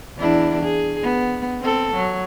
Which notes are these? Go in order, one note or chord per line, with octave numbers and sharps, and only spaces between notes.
E2 D4 E4
G#4
B3
C4 A4
F#3